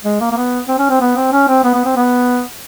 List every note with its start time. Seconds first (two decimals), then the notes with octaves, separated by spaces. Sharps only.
0.04 G#3
0.21 A#3
0.31 A#3
0.37 B3
0.68 C4
0.79 C#4
0.90 C4
1.00 B3
1.16 C4
1.32 C#4
1.48 C4
1.64 B3
1.75 B3
1.85 C4
1.96 B3